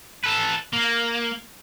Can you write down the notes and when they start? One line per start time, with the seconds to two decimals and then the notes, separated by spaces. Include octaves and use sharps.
0.24 A4 B4
0.73 A#3